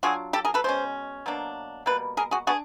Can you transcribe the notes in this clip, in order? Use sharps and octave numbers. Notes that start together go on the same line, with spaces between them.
F#3 A#3 D4 F4 F#4 G#4
G4 A4
G#4 A#4
A4 B4
B2 G#3 C#4 C5
B2 F#3 A#3 D4
B2 G3 A#3 B4
G#4 A#4
F#4 G#4
B3 D4 F#4 G#4